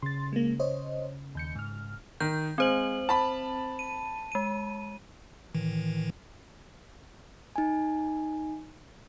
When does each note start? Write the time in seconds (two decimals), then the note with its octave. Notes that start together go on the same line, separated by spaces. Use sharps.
0.02 C#3 C6 A6
0.33 G#3 A#3
0.60 C5 C#5 D#5
1.35 D#2 G6 C#7
1.55 G#2 F6
2.20 D#3 G6
2.58 G#3 C4 C5 F#7
3.09 A5 B5
3.79 D#7
4.32 G#3 D#7
5.54 A2 D#3 E3
7.56 D#4 G#5